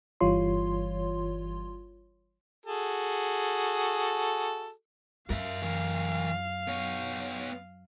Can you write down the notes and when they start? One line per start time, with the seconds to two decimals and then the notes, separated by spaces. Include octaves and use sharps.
0.21 G1 E3 G3 F4 C#5 C6
2.66 F#4 G#4 A4
5.30 F#2 A#4 E5 F5
5.62 E3 A#4
6.67 B3 C#5